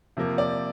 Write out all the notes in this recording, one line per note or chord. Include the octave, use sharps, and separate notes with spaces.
C3 F3 A#3
D5